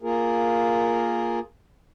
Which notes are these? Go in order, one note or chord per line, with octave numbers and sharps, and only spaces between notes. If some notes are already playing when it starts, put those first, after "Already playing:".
A#3 F4 G#4 A#4